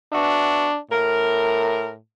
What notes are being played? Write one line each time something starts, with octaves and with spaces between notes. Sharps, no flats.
B3 D4 F#4 E5
A2 A#4